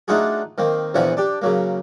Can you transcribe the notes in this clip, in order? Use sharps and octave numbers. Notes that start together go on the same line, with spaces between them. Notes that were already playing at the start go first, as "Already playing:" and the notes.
A3 D4 D#4 F4 F#4 G#4
D#3 A#3 C4
A#1 E2 E3 F3 C#5 F#5
D4 G4
C#3 F#3 A#3